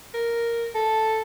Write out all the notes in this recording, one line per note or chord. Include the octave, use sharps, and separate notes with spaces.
A#4
A4